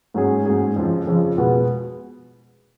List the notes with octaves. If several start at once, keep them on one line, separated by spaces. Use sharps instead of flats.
G#2 F#3 C#4 G#4
G#2 F#3 C#4 G#4
F2 C#3 F3
F2 C#3 F3
B2 G#3 B3